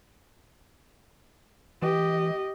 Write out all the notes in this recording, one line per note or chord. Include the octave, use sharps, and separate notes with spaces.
E3 G4 D#5